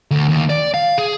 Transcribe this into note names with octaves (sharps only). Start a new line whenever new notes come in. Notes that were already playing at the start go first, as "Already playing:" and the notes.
D2
D#2
D5
F5
G#4